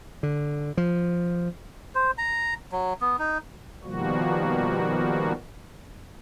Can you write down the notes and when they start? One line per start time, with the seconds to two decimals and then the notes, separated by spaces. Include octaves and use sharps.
0.23 D3
0.77 F3
1.95 C5
2.18 A#5
2.72 F#3
3.01 B3
3.19 D#4
3.84 B2 D#3 F3 G3 A#3 F#4